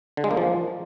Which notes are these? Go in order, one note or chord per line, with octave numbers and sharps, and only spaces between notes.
D3
G#3
A#3
F3